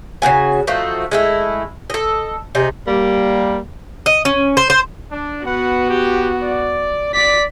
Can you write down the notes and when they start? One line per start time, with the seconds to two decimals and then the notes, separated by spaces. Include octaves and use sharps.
0.22 C#3 G3 F#4 G#5
0.67 F3 A3 D#4 F#4
1.11 G#3 A3 E4
1.90 A4 D#5
2.55 C3 D#4 G#4
2.88 G3 A#3
4.06 D#5
4.25 C#4
4.57 C5
4.70 C5
5.11 D4
5.46 B3 F#4 B4 F#5
5.90 G4
6.43 D5
7.15 D5 B6